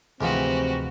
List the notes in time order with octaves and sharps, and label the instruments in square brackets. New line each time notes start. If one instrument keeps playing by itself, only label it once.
[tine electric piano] D2 C3 [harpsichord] G#2 E3 F3 [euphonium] C4 [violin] F#4 G4